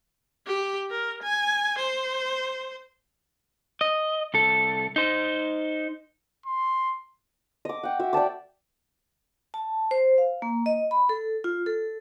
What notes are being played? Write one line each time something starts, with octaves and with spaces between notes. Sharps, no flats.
G4
A#4
G#5
C5
D#5
C2 A4
D#4 C5
C6
D#5 D6
F#5 G5
F#4 E5
D5 G5 A5 D6
A5
C5
F5
A#3
D#5
B5
A4
F4
A4